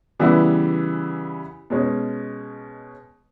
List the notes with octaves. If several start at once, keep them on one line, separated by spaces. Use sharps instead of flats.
C#3 E3 G3 B3 E4
B2 G#3 C#4